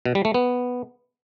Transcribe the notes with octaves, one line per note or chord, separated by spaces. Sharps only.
B2
G3
A3
B3